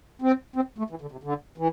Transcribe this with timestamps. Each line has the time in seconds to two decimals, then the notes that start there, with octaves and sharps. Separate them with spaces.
0.22 C4
0.56 C4
0.78 A3
0.90 E3
1.01 D3
1.12 C3
1.23 D3
1.58 E3